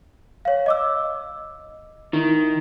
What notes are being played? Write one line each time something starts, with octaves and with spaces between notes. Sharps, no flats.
C#5 F5
D#5 D6 E6
D#3 D#4 E4